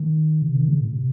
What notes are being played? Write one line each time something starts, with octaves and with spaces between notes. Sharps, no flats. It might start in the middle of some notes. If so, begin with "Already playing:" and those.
Already playing: D#3
C3
D#3
C#3
A2
C3